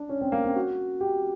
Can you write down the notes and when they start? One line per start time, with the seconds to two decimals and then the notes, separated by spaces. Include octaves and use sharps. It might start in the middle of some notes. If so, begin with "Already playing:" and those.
Already playing: D4
0.09 C#4
0.21 C4
0.32 A#3
0.44 C4
0.56 F#4
1.01 G4